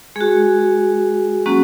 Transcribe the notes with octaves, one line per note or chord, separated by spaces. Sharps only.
G#3 F#4 G#4
F#3 A#3 C#4 F#4